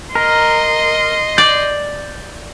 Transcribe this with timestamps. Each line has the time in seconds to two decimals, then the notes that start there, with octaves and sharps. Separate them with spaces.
0.15 A#4 D#5 C6
1.38 D5 G6